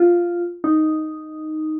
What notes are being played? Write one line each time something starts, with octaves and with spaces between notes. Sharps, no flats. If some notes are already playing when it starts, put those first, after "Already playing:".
Already playing: F4
D#4